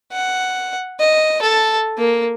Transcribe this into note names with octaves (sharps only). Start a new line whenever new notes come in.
F#5
D#5
A4 A5
A#3